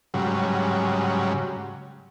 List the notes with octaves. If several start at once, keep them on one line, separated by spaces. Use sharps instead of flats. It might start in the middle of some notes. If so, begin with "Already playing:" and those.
G#2 C#3 F#3 G3